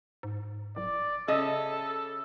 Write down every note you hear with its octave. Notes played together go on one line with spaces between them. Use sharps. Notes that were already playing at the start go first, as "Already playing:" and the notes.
G#2
D1 D5
C#3 A4 D#5 E5 E6